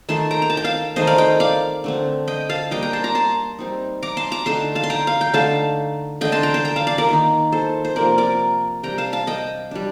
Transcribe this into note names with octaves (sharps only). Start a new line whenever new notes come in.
D#3 A3 D#4 A5 C6
G5 A#5
A#5
A5
G5
F5 A5
D#3 A3 C4 D#4 C5 D#5
D5 F5
D#5 G5
D5 F5
D3 A3 C4
D#5 G5
F5 A5
G3 A#3 D4 D#5 G5
G5 A#5
A5 C6
A#5 D6
A5 C6
G3 C4 D#4
A#5 D6
A5 C6
A#5 D6
D3 A3 D#4 A5 C6
F5 A5
C6
G5 A#5
F5
G5
D3 A3 D#4 F5 A5
D3 A3 D4 D#5 G5
A5 C6
G5 A#5
A5 C6
G5 A#5
F5 A5
D5 F5
A#4 D5
D#3 A#3 D#4
A4 C5
C5
C3 F3 A#3 A#4 D5
A#4 D5
C3 G3 D4 G5 A#5
F5 A5
F5 A5
D#5 G5
G3 D4